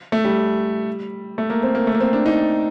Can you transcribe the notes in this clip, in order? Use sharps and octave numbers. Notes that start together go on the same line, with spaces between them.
A3
G3
A3
A#3
C4
A#3
A3
A#3
C4
D4
D#4